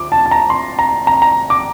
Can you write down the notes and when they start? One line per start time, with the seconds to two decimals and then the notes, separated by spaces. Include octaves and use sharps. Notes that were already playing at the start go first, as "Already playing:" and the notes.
Already playing: D2 F3 D6
0.12 A5
0.26 A5
0.31 A#5
0.50 C6
0.79 A#5
1.07 A#5
1.22 A#5
1.50 D6